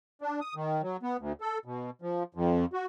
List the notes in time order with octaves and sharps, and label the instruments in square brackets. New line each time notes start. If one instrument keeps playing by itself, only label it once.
[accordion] D4
D#6
D#3
F#3
B3
D2
A4
B2
F3
F2
F#4